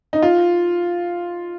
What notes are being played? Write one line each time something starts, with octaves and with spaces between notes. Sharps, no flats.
D#4
F4